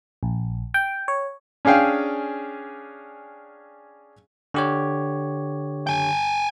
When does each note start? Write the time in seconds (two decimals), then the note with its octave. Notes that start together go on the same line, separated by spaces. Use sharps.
0.23 A#1
0.74 G5
1.08 C#5
1.65 C#4 D4 G#4 F5 G5
4.54 D3 G4 C#5
5.87 G5 G#5